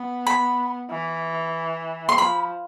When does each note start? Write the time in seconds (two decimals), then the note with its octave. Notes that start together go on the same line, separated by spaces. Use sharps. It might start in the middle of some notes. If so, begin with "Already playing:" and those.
Already playing: B3
0.27 B5
0.90 E3
2.09 C6
2.18 F3 B5